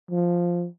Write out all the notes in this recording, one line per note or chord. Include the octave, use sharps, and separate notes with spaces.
F3